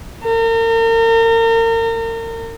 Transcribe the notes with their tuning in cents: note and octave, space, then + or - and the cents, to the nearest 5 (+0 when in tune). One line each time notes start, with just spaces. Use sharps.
A#4 -35